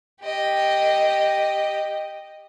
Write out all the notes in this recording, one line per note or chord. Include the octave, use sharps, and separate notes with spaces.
G4 D#5